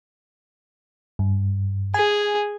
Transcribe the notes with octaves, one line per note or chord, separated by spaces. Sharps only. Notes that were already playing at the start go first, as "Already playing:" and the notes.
G2
G#4 G#5